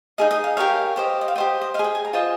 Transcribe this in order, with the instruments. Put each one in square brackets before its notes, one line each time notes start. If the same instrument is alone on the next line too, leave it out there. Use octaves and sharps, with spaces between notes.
[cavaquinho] D#4 G#4 D#5 F5
D#5
F5
G4 A#4 C#5 F5
G4 C5 D#5
D#5
F5
G4 C5 D#5 G5
D#5
D#5 F5
G#4
G5
G#5
A#5
F4 C5 D#5 C6